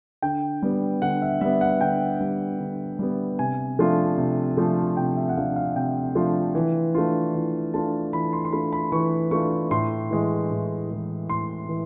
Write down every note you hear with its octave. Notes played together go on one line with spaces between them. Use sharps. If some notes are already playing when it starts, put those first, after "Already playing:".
D3 G5
G3 B3
D3 F#5
E5
G3 B3 E5
F#5
D3 G5
G3 B3
D3
G3 B3
C3 G#5
F3 A3 D4 F4
C3
F3 A3 D4 F4
C3 G5
E5
F#5
F3 A3 D4 F4 F5
F5
C3 G5
F3 A3 D4 F4
E3
A3 D4 F4
E3
A3 D4 F4 A5
E3 B5
C6
C6
A3 D4 F4 B5
B5
E3 C#6
A3 D4 F4 C#6
A2 C6
E3 G#3
A2
E3 G#3
A2 C6
E3